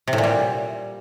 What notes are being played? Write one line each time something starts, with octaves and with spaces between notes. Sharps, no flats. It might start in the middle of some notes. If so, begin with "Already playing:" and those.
C3
A2
A#2
G3